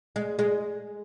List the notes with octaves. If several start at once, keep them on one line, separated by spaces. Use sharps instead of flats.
G#3
G#3